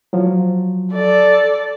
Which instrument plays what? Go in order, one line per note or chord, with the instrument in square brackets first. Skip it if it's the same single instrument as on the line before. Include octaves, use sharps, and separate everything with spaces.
[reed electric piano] F3 F#3
[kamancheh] A4 D5